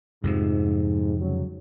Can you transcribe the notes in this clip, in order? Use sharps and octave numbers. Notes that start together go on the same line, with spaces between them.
F2 G#2 C3 F3
C#3 F#3